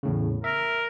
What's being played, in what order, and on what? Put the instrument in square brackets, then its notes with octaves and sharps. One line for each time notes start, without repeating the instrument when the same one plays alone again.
[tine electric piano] E2 A2 C#3
[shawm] A#4 [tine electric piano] E5